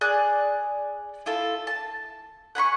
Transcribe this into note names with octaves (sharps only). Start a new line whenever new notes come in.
G#4 D5 F#6
E4 F4 A4
A5
F#5 G#5 B5 C#6